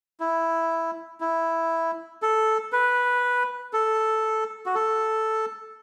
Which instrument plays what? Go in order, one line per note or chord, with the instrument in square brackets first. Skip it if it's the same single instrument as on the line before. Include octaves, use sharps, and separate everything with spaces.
[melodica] E4
E4
A4
B4
A4
F#4
A4